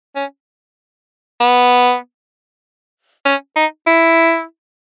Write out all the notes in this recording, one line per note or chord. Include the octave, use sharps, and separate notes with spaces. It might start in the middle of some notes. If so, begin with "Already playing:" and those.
C#4
B3
C#4
D#4
E4